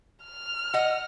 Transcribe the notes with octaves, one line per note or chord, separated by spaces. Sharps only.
F6
D#5 F#5